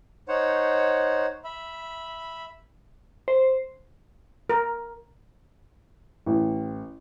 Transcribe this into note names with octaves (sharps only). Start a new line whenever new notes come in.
D#4 C5 C#5 F#5
E5 B5
C5
A#4
A1